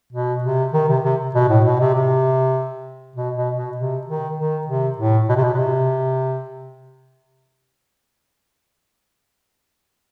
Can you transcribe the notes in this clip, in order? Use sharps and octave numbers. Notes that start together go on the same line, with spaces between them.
B2
C3
D#3
C3
C3
B2
A2
B2
C3
C3
B2
B2
B2
C3
D#3
D#3
C3
A2
B2
C3
B2
B2
C3